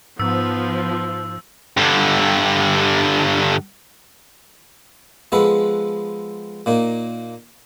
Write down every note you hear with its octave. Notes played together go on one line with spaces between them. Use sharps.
G#2 F3 B3 E6
G2 D3
F3 G#3 B3 A4 B4
A#2 A#3 D#4